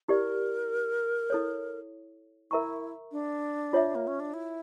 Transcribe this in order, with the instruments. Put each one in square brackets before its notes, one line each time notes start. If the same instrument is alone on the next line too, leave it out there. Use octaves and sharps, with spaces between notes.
[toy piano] E4 G4 D5 [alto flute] A#4
[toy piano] E4 A4 C#5
[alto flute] E4 [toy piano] A#4 E5 A#5 C#6
[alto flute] D4
[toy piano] F4 C#5 E5
[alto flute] A#3
C#4
D4
E4